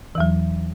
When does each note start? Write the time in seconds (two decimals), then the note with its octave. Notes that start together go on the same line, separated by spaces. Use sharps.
0.15 E3
0.18 E2
0.20 F#3